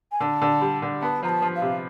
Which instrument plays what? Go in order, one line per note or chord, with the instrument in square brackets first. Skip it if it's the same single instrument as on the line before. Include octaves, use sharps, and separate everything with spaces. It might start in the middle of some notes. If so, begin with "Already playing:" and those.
[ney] G#5
[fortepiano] D3 [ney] A5
[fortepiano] D3
G3
D3
[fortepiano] B3 [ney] A5
[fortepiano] F3 [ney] A#5
[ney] A5
[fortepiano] F3
[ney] F5
[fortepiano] C3